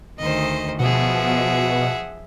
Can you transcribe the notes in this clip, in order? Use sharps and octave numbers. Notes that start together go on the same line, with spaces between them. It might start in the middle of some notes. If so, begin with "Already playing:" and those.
D2 D#3 C5 D#5
B2 F3 G#4 E5 F#5